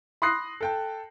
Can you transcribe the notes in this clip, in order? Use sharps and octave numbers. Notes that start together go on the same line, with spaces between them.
B5 C6 D#6 F#6 A#6 C7
A4 G5 A5